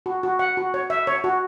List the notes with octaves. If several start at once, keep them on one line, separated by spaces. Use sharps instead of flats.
F#4
F#4
F#5
F#4
C#5
E5
C#5
F#4